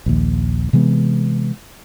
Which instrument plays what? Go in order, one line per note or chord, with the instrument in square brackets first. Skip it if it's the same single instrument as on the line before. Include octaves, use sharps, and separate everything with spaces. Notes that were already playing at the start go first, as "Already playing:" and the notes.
[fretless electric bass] A#1 D#2
C3 E3 G#3 B3